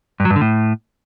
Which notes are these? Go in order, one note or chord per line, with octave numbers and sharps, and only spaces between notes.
G2
F#3
G2
D3
A2